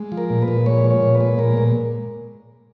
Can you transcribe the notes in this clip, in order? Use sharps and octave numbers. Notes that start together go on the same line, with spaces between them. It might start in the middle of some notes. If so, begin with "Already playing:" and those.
Already playing: G#3
F3
A#4
A#2
B4
A#2
G#3 C#5
F3
C#5
A#2
B4
G#3
A#2 A#4
A#2